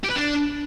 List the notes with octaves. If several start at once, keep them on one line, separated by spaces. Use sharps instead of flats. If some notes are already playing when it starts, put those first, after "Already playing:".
G4
B4
D4